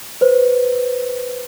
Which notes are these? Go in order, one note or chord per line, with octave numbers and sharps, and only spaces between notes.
B4 C5